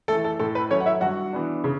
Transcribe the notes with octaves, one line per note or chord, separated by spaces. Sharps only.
E3 A3 A4
A4
A2 A4
B4
F#3 A3 C#4 C#5
F#5
E4 E5
G2 F#4 F#5
E3 B3 D4
C#3